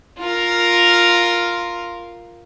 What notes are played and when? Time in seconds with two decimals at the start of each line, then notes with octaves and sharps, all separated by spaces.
0.18 F4 A#4